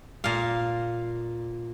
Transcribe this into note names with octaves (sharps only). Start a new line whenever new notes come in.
A#2 F5